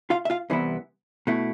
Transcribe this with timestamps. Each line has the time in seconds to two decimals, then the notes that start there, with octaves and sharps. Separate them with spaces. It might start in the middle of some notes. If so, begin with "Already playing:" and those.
0.10 F4 F5
0.25 E5
0.30 F4 F5
0.50 C2 C3 E3 B3 E4
1.27 B2 A3 E4